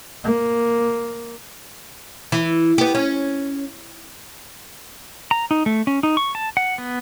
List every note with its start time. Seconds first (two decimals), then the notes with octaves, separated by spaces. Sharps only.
0.24 A#3
2.32 E3
2.78 B3 G4
2.95 C#4
5.31 A#5
5.51 D#4
5.66 A3
5.87 C#4
6.03 D#4
6.17 C#6
6.35 A5
6.57 F#5
6.78 B3